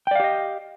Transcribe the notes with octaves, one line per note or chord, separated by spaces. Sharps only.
G4 D5 D#5 F5 G5